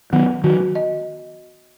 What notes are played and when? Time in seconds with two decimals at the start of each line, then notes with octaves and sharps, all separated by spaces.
0.13 D#3 F#3 B3
0.44 D#3 F#3 F#4
0.75 D#5